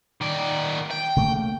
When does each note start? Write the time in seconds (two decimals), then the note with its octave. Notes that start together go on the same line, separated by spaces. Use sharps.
0.21 D#3 D5
0.91 G5
1.16 C#3 A3 A#3